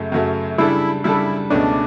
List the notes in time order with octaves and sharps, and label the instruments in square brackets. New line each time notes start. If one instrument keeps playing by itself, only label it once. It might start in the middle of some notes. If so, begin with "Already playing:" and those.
Already playing: [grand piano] F#2 C#3 F#3 A3
F#2 C#3 F#3 A3
[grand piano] C#3 G3 D4 A4 [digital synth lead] E4
[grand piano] C#3 G3 D4 A4 [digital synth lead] E4
[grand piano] C#2 B2 A3 C#4 [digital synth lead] D4